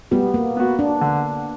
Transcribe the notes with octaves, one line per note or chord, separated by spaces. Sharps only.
G3 B3
A#3
B3 F#4
D4
D3